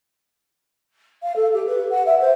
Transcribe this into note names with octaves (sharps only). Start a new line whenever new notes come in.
F5
A4
G4
B4
F#5
E5
C5